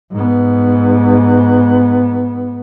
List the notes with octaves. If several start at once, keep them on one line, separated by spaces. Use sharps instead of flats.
G#2 B3